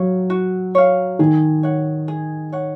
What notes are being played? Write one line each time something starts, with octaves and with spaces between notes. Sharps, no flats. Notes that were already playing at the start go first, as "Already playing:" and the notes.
Already playing: F#3 C#5 F5
F#4
C#5 F5
D#3 G#4
C#5 F#5
G#4
C#5 F#5